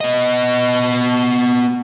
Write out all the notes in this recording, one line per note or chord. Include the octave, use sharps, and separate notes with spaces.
B3 D#5